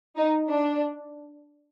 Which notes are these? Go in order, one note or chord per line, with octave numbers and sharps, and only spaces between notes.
D#4
D4